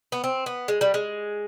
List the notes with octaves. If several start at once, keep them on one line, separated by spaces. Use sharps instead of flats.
B3
C4
B3
G#3
G3
G#3